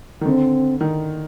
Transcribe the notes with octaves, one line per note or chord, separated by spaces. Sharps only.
D#3
D3 C4
D#3